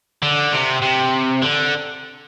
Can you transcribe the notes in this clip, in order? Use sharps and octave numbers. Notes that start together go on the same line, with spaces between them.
D3
C3
C3
D3